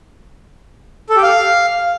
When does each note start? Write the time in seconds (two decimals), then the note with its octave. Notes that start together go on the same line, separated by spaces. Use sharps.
1.10 A4
1.16 G4
1.23 F5